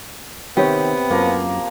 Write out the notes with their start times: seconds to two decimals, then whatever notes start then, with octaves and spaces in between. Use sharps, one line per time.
0.57 C3 D#3 B3 G4 C#5
1.10 F#2 F3 A#3